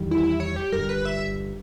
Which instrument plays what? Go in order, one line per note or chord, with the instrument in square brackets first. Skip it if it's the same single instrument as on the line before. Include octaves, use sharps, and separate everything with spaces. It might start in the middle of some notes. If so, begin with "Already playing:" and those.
Already playing: [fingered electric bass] E2 D#3 G3
[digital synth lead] E4
E4
C#5
G4
[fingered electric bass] G1 G2 G3 [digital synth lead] A#4
[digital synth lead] B4
E5